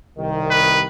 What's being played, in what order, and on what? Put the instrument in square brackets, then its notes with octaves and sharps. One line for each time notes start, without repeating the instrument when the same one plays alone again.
[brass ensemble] C2 D#3
[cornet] B4